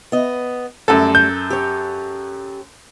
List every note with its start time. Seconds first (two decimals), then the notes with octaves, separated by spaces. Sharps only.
0.12 B3 D#5
0.88 F#2 G3 A3 A4
1.15 G6
1.50 G4 C#5